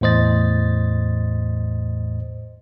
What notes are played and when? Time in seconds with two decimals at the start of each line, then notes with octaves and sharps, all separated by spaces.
0.01 E2 A2 C5 D#5 A6